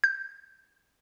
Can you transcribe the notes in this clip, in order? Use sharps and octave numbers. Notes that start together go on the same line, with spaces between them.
G6